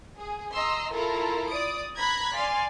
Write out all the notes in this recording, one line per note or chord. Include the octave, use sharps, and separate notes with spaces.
G#4
D#5 A#5 C6 E6
E4 F4 A4 A#4 A#5
D5 D#6 D7
A#5 B5 F#6 G#6 B6
D5 F5 G#5 C6